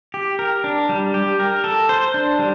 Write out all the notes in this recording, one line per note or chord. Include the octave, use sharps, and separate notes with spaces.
G4
A#4
D4
G3
G4
A#4
A4
C5
D4
G3